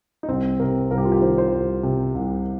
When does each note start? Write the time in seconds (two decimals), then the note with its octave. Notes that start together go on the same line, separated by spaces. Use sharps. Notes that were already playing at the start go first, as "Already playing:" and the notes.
0.23 D#4
0.28 C2 C4
0.60 C3 A#4
0.91 C2 A#4
0.98 G4
1.05 F4
1.12 G4
1.21 D#3 C5
1.38 C5
1.52 C2
1.83 C3
2.15 C2